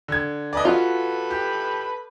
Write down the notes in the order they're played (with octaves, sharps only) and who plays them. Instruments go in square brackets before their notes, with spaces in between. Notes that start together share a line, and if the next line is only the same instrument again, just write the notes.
[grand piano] D3 G#6
[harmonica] A4 B4 B5 [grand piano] D5 D#5
[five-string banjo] F4 [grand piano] F#4
[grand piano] G4